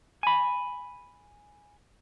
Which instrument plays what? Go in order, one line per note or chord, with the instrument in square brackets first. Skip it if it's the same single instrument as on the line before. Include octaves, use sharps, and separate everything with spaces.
[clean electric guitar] G#5 B5